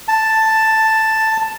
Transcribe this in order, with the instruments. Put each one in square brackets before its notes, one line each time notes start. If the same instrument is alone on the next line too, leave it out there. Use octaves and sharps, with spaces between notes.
[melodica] A5